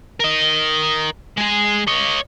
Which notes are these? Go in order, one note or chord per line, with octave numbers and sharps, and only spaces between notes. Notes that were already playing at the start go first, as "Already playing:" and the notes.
A#4 D#5
G#3 G#4
C#5 D#5